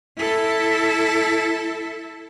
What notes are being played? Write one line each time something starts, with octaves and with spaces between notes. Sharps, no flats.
E4 A4